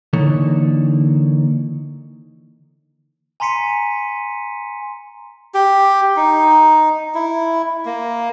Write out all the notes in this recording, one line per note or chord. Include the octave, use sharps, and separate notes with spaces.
D3 E3 A#3 D#4 A4 C#5
G#5 A#5 C6 B6 C#7 D#7
G4
D#4
E4
A#3